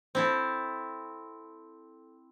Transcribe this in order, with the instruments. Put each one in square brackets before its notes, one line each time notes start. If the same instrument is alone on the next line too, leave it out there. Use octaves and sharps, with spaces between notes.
[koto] C4 E4 A4